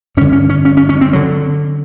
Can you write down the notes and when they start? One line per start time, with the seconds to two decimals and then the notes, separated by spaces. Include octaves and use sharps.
0.17 G2 C#4
0.21 D3
0.32 C#4
0.50 C#4
0.65 C#4
0.77 C#4
0.89 C#4
1.01 C4
1.13 D3 F#3